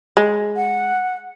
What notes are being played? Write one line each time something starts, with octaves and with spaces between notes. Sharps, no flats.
G#3
F#5